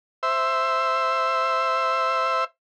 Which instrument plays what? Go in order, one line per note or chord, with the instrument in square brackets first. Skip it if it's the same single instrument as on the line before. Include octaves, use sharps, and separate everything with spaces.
[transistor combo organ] C5 E5